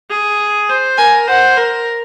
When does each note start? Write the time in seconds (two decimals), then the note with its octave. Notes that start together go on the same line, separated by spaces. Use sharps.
0.10 G#4
0.70 C5
0.98 A#4 G#5
1.27 C5 F#5
1.57 A#4